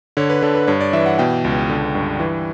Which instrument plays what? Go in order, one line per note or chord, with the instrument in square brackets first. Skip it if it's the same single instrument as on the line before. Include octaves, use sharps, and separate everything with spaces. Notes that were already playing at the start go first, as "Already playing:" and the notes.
[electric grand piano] D3 C#5
B4
D3 A4
B4
G2 C#5
D5
E3 E5
F#5
B2 G5
C#2
D3
G2
E3